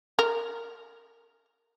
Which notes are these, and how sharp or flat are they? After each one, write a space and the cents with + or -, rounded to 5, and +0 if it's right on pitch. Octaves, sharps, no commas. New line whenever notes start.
A#4 -10